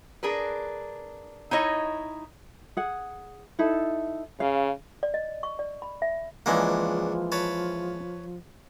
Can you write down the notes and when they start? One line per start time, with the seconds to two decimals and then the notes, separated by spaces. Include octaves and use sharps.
0.23 D4 G#4 A#4 B4
1.51 D#4 E4 C#5 D#5
2.77 G#4 F#5
3.59 D#4 E4 A4
4.40 C#3 F5
5.03 D5
5.14 D#5
5.43 C#6
5.59 D5
5.82 B5
6.02 E5
6.46 C#2 E3 F3 G#3 A#3 D4 F#5
7.32 B4 C#5 A5